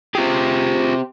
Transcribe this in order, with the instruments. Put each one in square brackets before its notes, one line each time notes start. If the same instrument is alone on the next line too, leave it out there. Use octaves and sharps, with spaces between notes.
[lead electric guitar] C4 G4 [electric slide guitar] F4 G#4